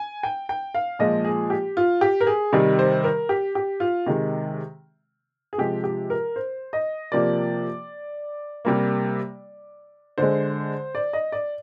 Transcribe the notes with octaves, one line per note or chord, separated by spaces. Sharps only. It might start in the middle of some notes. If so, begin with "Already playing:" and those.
Already playing: G#5
G5
G5
F5
A#2 F3 G#3 D#5
G#4
G4
F4
G4
A#4
G#4
C3 D#3 G3
C5
A#4
G4
G4
F4
C3 D#3 G#3
G#4
C3 F3 G#3 G4
G4
A#4
C5
D#5
C3 F3 A#3 D5
C3 G3 A#3
D3 G#3 C5
D5
D#5
D5